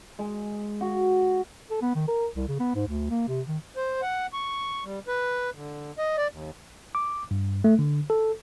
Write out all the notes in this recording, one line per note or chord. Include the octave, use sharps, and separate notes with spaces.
G#3
F#4
A4
B3
D#3
A#4
C2
C#3
B3
G#2
D2
A#3
C3
D#3
C5
F#5
C#6
G3
B4
D3
D#5
D5
D#2
D6
G2
A3
D3
A4